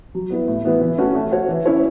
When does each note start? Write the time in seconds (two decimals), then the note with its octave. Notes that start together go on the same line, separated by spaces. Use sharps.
0.15 F#3
0.30 B3 E4 B4
0.48 A2
0.65 E3 B3 E4 B4
0.81 E3
0.98 A3 C#4 F#4 B4
1.15 A3
1.32 F#4 C#5
1.49 E3
1.66 C#4 E4 C#5